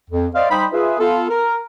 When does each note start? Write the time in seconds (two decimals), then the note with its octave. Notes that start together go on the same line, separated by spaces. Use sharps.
0.10 F2
0.35 C5 D5 D#5 F5
0.50 G3 D#4 C5 D#5 G5 B5
0.73 F4 G#4 B4 E5
0.99 B3 F4 A4
1.29 A#4